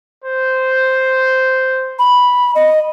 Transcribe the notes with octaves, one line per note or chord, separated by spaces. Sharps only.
C5
B5
D#5